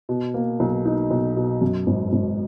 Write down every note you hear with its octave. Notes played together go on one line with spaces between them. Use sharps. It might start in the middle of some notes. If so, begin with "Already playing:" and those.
B2
A#3
B1
D#4
B1
B2
F#2
G#1
G#1